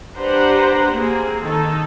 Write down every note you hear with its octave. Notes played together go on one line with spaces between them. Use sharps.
D4 G4 B4 C5 F#5 A#5
A#3 C4 G#4
D#3 D#4 A4